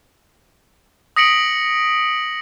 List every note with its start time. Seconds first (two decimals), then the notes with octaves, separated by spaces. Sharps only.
1.16 D#6 A#6 B6 C#7 D7 F#7